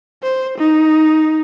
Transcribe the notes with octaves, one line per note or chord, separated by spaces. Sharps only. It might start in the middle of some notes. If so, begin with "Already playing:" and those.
C5
D#4